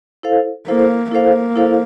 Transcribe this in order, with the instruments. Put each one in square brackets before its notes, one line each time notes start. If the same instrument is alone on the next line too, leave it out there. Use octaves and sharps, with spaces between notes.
[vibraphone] E4 A4 C5 F5
[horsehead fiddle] A#3 [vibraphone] E4 A4 C5 F5
[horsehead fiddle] A#3 [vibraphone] E4 A4 C5 F5
[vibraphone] E4 A4 C5 F5